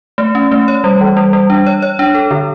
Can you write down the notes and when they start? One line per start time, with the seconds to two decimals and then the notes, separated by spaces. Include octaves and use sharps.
0.18 A3
0.35 C#4
0.52 A3
0.68 C#5
0.84 G3
1.01 E3
1.17 G3
1.33 G3
1.50 D4
1.66 C#5
1.82 C#5
1.99 D4
2.15 A4
2.31 D3